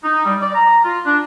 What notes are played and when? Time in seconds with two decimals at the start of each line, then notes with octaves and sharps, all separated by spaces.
0.03 D#4
0.25 G3
0.40 D5
0.54 A#5
0.84 F4
1.05 D4